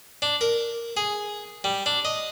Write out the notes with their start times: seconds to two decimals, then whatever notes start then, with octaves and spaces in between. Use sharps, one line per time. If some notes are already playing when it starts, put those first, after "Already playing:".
0.22 D4
0.41 A#4
0.97 G#4
1.64 G3
1.86 D4
2.05 D#5